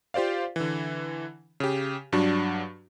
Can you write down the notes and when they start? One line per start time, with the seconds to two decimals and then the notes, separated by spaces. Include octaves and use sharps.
0.14 F4 G4 C5 D5 F5
0.56 D3 E3
1.60 C#3 G4
2.13 G2 F#3 D4 F#4